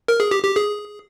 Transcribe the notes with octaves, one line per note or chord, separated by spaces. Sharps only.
A#4
G#4
G4
G4
G#4